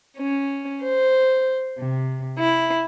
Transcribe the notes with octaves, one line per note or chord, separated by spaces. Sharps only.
C#4
C5
C3
E4